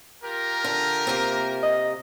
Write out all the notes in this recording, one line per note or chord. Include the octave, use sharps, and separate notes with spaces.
F4 G4 A#4
D3
C3 A#3
D#5